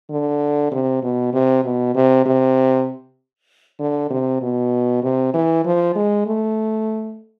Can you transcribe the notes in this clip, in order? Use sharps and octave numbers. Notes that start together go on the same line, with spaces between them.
D3
C3
B2
C3
B2
C3
C3
D3
C3
B2
C3
E3
F3
G#3
A3